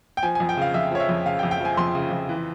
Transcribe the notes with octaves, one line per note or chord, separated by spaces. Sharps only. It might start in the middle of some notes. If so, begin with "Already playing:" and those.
G5
F3 G#5
F2 G#5
G5
C#3 F5
F2 E5
F3 C#5
E5
F2
C#3 F5
G5
F2
G5
F3 G#5
F2 C6
C#3
F2
E3